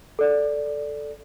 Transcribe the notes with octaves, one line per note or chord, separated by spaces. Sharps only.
A4 D5